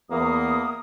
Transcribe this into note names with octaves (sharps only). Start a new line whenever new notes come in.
E2 A#3 D#6